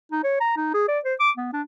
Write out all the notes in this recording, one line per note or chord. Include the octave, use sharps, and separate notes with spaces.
D#4
C#5
A#5
D#4
G#4
D5
C5
D6
B3
D4